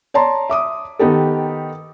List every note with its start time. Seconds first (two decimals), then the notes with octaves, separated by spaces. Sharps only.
0.14 C#5 D5 A5 A#5 C6
0.50 E5 D6 D#6
0.99 D#3 B3 D#4 G4 A4